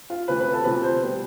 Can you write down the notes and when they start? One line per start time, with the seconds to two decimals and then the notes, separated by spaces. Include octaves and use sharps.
0.10 F4
0.28 D2 C3 F3 B4
0.40 B4
0.53 A4
0.64 D2 C3 F3 B4
0.83 C5
1.02 B2 G3 B3